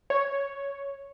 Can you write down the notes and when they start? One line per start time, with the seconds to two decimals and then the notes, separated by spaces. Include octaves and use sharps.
0.10 C#5